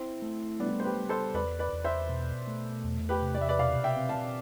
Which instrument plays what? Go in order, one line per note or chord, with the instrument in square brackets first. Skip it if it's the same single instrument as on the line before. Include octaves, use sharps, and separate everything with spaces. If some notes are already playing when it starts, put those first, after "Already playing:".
Already playing: [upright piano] C4 [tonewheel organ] E4
[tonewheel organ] A3
[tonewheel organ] G3 [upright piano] B3 D4
[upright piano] C5
G4 B4
[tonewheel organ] G3
[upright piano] A4 C5
[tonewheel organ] E2 [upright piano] B4 D5
[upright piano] B4 D5
[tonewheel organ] E2
[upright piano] C5 E5
[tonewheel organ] B2
A3
E2
[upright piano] G4 B4
[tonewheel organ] C3
[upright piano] D5
E5
B4 D5
[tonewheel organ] B2 [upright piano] D5 F5
[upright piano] E5 G5
[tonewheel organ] C4
[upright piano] F5 A5